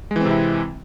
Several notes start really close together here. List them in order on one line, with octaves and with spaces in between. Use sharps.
G#3 E3 C4 C3 E4